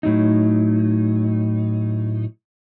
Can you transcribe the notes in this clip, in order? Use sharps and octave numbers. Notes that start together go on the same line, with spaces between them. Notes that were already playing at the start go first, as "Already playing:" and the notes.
A2 F#3 D#4